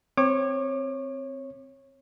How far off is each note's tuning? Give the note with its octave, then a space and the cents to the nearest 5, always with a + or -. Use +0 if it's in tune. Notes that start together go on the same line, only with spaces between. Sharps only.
C4 +0 C#5 -15 D6 +30